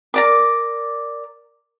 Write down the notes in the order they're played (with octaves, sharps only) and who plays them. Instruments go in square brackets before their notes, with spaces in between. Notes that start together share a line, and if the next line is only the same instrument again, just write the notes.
[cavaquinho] A#4 D5 D6